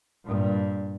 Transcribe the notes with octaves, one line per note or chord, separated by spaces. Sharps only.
G2 A#2